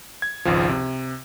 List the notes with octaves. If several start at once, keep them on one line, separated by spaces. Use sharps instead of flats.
G#6
G#1 C#2 F3
C3